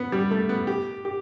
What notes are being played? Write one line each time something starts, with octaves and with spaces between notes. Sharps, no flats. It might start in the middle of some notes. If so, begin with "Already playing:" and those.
Already playing: B3
G3
A3
B3
G4
G4